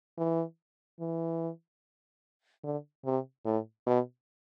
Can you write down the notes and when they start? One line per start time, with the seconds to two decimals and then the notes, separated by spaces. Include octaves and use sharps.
0.18 E3
1.00 E3
2.64 D3
3.05 C3
3.45 A2
3.87 B2